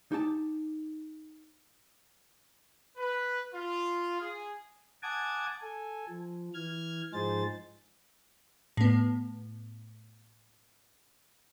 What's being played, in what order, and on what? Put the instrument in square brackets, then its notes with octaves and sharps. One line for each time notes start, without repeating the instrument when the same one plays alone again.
[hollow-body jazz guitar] D#4 G4 A5
[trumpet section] B4
F4
G#4
[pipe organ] F#5 G#5 A5 D6 D#6 G#6
A4 G#5
F3
E3 F6 G#6
G#2 F3 D#4 G#4 C5 A6
[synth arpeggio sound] A2 B3